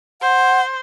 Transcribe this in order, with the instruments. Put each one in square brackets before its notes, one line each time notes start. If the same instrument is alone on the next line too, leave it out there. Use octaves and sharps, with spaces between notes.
[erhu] C5 [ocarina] F#5